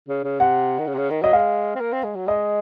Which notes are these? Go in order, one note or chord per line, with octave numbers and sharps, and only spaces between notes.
C#3
C#3
C3 F#5
D#3
C#3
C3
C#3
D#3
F#3 D#5
G#3 F5
C4
A#3
C4
G#3
F#3
G#3 D#5